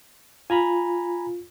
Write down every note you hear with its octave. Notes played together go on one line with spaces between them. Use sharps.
F4 G#5 A#5 B5